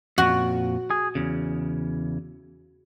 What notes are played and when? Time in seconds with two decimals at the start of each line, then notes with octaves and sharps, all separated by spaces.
0.18 F2 A#2 F#4
0.90 G#4
1.15 E2 C#3